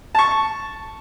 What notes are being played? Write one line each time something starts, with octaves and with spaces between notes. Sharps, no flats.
A5 C#6